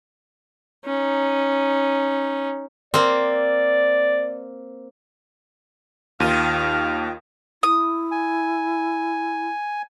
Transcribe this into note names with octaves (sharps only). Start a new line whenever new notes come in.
C#4 D#4
A#3 C4 D5
D#2 D#3 F4 F5 D#7
E4 D#6
G#5